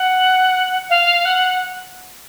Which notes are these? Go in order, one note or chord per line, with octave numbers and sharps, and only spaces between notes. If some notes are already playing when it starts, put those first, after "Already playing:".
Already playing: F#5
F5
F#5